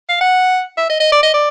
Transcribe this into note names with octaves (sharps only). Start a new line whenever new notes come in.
F5
F#5
E5
D#5
D#5
D5
D#5
D5